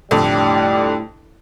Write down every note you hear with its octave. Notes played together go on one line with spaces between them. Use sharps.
E1 F2 A2 D3 G3 D4